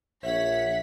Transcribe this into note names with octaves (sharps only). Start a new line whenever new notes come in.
A#1 C#5 E5 F#5 B6